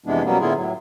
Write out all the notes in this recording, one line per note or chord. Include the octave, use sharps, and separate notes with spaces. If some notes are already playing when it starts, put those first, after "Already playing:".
F2 C3 E3 G#3 B3 D4
B2 F#3 G3 A#3 B3 C#4
A2 D3 B3 E4 F4 G#4
A2 F#3